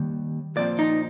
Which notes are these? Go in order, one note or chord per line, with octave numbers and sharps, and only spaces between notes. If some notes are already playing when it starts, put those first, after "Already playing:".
Already playing: D#2 D#3 G3
A#2 F3 C4 D5
D#4